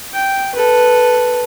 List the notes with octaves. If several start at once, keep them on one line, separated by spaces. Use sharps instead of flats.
G5
A4 B4